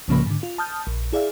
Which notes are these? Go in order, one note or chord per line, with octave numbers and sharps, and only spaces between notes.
C2 A2 C#3 F3 A#3 B5
G#2 D3
F4
A5 D#6 F6 G6
A#1
E4 G#4 D5 E5 F5